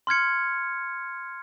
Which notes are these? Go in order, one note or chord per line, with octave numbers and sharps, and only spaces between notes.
C6 F6 G#6 C#7